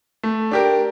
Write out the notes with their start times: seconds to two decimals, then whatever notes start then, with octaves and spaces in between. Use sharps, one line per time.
0.23 A3
0.51 D4 G4 A#4